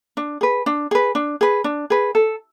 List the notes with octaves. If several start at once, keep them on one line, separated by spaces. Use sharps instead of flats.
D4
G#4 B4
D4
G#4 B4
D4
G#4 B4
D4
G#4 B4
A4